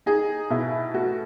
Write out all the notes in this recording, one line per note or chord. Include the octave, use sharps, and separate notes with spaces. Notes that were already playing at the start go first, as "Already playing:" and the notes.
D#4 G#4
B2 E4
A3 F#4